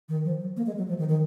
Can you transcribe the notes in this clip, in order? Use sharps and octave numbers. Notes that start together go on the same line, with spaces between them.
D#3
F3
F#3
A#3
G#3
F#3
F3
D#3
D#3